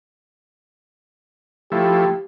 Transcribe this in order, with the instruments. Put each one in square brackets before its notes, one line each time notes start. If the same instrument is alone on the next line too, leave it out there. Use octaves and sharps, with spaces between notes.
[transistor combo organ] F3 A3 E4 [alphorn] G4